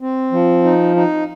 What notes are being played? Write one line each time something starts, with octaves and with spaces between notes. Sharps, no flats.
C4
F3
D#4
D#4